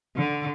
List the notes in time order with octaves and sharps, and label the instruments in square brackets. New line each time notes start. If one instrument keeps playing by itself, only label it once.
[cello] D3